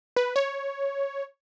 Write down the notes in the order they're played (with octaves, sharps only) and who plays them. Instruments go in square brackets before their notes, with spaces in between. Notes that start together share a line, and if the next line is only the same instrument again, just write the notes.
[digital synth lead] B4
C#5